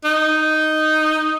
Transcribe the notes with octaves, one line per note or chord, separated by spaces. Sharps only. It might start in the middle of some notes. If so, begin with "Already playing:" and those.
D#4